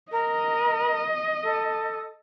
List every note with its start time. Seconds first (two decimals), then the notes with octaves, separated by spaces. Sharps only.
0.11 A#4 D#5
1.43 A4